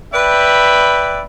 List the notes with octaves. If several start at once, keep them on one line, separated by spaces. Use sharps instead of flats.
B4 D5 E5 G5 B5